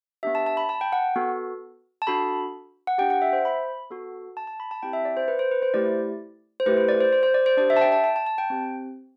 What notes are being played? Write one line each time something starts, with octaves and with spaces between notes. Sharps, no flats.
B3 D4 G4 E5
A5
A5
B5
A5
G5
F#5
B3 F#4 A4
A5
D4 F#4 A4 B5
F#5
D4 G4 G5
F#5
E5
C5
B5
B3 F#4 A4
A5
A5
B5
A5
C4 E4 G4 G5
E5
D5
C5
B4
C5
B4
C5
A3 E4 G4 D5
C5
A3 E4 G4 B4
C5
D5
C5
C5
C5
D5
C5
D4 G4 D5
E5
A5
G5
A5
A5
A5
A5
G5
C4 G4